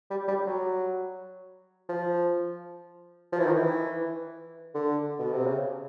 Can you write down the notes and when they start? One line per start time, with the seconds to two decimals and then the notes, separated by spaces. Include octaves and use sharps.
0.11 G3
0.28 G3
0.46 F#3
1.89 F3
3.32 F3
3.39 E3
3.46 D#3
3.54 E3
4.75 D3
5.19 B2
5.32 C3
5.46 C#3